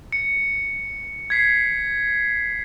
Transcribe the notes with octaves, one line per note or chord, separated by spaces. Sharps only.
C#7
G#6 B6 C7